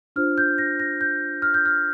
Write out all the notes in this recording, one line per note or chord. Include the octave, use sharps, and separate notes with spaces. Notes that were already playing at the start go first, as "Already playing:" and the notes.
D4 F4 C5 F6
G6
A#6
A#6
G6
F6
G6
F6